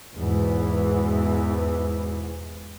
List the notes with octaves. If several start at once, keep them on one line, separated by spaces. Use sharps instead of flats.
E2 G#2 B2 E3